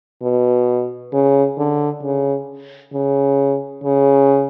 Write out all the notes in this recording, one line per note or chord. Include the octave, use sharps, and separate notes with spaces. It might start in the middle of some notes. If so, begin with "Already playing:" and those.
B2
C#3
D3
C#3
C#3
C#3